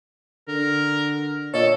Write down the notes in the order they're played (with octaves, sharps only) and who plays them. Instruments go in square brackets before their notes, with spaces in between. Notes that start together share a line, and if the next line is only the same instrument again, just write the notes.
[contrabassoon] D3 [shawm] A#4
[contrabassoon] A#2 [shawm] A4 [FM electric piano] C#5 D#5 E6